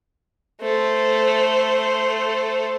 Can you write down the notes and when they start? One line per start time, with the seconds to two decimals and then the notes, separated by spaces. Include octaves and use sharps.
0.61 A3 C5